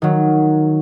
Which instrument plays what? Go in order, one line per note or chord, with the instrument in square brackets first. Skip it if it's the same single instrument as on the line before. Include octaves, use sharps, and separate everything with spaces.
[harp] D#3 F#3